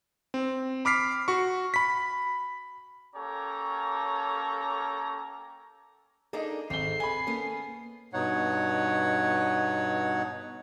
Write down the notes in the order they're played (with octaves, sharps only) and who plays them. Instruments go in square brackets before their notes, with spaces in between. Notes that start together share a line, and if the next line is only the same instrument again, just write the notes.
[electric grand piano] C4
B5 D6 F6 B6 C7
F#4 C#6
B5 B6
[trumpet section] A#3 C#4 G4 A4 C#5 A#5
[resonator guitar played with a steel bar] A#3 D4 D#4 [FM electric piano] G#4 A4 D#5
[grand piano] G#1 G7 [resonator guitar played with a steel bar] C4 [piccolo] C7
[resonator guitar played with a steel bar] B3 [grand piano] G#5 B5
[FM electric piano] A#3 A4 [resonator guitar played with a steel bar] B3 C#4
[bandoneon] G2 B2 D#4 C#5 F#5